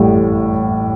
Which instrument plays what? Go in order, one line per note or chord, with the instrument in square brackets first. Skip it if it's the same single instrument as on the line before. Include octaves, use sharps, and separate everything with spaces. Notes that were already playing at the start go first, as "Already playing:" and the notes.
Already playing: [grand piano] A1 A2 G3